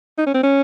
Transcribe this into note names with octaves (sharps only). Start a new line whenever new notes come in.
D#4
C#4
C4
C#4